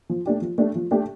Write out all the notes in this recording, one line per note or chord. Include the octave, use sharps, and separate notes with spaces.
F3
A3 D4 G4
F3
A3 D4 G4
F3
A3 D4 G4